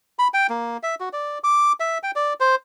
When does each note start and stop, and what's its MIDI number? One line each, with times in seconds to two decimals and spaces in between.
0.19 0.28 83
0.34 0.47 79
0.50 0.77 58
0.83 0.95 76
1.00 1.09 66
1.13 1.39 74
1.44 1.72 86
1.80 1.98 76
2.03 2.11 79
2.16 2.34 74
2.40 2.55 72